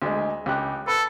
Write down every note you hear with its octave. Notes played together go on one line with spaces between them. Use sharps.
D2 G#3
C#2 G4 F#6
A4 B4